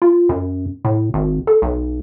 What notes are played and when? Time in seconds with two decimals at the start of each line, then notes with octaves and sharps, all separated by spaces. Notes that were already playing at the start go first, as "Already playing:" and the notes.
0.02 F4
0.29 F#2
0.85 A2
1.14 G#1
1.47 A4
1.62 B1